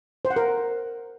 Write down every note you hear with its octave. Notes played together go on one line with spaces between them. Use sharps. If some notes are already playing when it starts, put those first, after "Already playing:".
C5
F#5
A#4